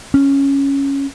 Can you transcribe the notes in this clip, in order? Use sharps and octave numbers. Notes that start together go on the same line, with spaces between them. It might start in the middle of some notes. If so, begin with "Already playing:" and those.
C#4